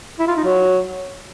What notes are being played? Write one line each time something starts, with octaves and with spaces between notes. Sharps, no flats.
E4
F4
D#4
F#3